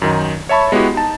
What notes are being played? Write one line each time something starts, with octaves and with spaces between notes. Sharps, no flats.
F#2 D#3 D#4
C#5 E5 A5 B5 C#6
G#3 B3 E4 F#4 G4
D#4 A5